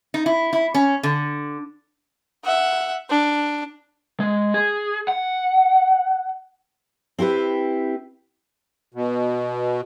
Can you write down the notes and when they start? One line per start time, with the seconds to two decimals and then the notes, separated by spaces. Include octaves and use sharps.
0.14 D#4
0.26 E4
0.53 E4
0.74 C#4
1.03 D3
2.44 E5 F#5
3.10 D4
4.20 G#3
4.54 G#4
5.08 F#5
7.18 C4 E4 G4 B4
8.94 B2